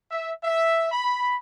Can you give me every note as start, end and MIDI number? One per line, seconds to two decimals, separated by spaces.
0.11 0.32 76
0.43 0.91 76
0.92 1.37 83